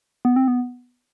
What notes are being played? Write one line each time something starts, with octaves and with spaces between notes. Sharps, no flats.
B3
C4
B3